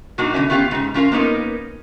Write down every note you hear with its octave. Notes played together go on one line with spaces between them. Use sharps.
A#2 F#3 A#3 D4 D#4 F#4
B2 D3 B3 C#4 E4
B3 C#4 F4 G4 D#5 F5
G#2 C#3
F3 C#4 F4 A#4 F5
A#3 B3 C#4 D#4 A#4